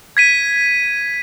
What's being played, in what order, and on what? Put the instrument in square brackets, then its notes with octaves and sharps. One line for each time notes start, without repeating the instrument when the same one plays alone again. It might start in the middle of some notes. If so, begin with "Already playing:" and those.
[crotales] G#6 B6 D#7